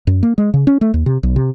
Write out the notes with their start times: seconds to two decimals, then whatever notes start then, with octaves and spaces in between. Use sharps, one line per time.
0.07 F#2
0.23 A#3
0.38 G#3
0.54 C#3
0.67 C#4
0.81 A3
0.94 D#2
1.06 C3
1.23 B1
1.36 C3